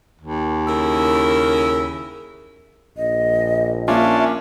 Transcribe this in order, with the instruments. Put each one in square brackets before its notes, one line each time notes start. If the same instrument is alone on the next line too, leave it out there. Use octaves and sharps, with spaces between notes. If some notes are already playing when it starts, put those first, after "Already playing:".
[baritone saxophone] D#2
[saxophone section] C#3 E4 A#4
[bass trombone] A#1 [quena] D#5
[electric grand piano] A#3 F4 [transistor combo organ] C#4 D4 [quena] E5